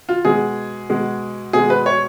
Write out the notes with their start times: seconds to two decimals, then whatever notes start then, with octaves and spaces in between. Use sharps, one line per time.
0.09 F4
0.25 B2 G#3 G#4
0.90 B2 G#3
1.53 B2 G#3 G#4
1.70 B4
1.86 C#5